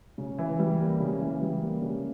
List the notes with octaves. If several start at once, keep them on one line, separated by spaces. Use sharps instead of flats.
C#3
E3
G3
A#3
C#3
E3
G3
A#3
C#3